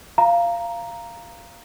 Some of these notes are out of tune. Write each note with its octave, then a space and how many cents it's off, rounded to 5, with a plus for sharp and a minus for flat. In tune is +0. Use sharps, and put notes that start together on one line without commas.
F5 -15 A#5 +0